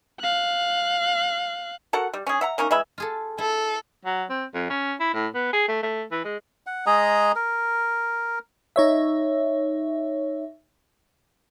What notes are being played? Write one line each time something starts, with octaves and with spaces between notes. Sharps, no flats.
F5 F#6
F#4 A4 A#4 F#5
G3
C#4 G#4
E5 F#5 A#5
A#3 C#4 D#4 A#4
E3 G#3 E5 B5
F4 G#4 A4
E4 A4
F#3
C4
F2
C#4
E4
A2
B3
G#4
A3
A3
E3
G#3
F#5
G#3 G#4 D#5 A#5
A#4
D#4 C#5 E5